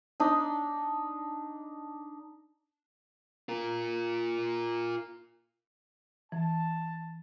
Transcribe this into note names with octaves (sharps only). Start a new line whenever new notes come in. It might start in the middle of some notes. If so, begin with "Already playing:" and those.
D4 D#4
F4 A#4
E3 A5